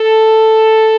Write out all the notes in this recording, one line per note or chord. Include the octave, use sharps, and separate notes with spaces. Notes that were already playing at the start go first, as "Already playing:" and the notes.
Already playing: A4